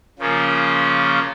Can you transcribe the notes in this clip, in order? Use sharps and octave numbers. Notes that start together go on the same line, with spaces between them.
C#3 F3 A#3 C#4 F4